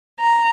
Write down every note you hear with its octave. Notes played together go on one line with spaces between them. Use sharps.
A#5